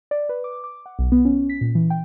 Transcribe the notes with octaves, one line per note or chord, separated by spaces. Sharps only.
D5
B4
D6
D6
F#5
B1
B3
C#4
B6
A#2
E3
G5